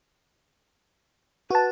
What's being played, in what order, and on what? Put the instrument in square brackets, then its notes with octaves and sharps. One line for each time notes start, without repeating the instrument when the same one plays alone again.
[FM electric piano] F#4 A5 [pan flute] B4